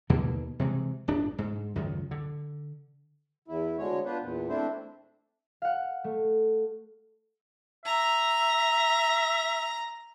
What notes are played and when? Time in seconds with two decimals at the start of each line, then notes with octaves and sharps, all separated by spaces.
0.10 D#2 B2 D3 A#3
0.59 C3 E3 G#3
1.08 D1 G1 D4
1.38 G#2
1.76 C#2 F#2 D#3
2.11 D3
3.48 E2 E4
3.78 D2 D3 G#3 C#5
4.05 B3 D4 F4 B4 C5
4.22 E2 A#2
4.49 A3 C4 D4 E4 C5
5.62 F5 F#5
6.04 A3
7.86 E5 A#5